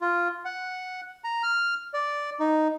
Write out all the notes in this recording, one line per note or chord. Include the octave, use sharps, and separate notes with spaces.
F4
F#5
A#5
F6
D5
D#4